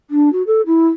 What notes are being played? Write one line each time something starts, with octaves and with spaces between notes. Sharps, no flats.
D4
F#4
A4
E4